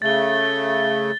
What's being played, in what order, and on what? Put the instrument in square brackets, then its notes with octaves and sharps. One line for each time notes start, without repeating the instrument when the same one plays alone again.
[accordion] C#3 A3 [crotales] A6 G7